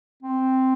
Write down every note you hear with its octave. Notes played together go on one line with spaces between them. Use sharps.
C4